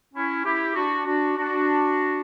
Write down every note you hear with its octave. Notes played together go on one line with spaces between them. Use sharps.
C#4 E4
E4 G4
D4 F#4
D4 F#4
D4 F#4